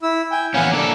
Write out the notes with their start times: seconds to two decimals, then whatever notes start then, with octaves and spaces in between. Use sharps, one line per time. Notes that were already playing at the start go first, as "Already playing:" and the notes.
0.03 E4 E6
0.31 G5 G#5
0.54 E3 B3 C#4 F5 F#5 G#5
0.72 A#3 D4 A4 D6